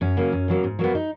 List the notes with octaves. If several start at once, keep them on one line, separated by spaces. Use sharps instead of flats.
F#2 C#4
C#3 F#3 A#3
F#2
C#3 F#3 A#3
G#2
F#3 A#3 B3
D#4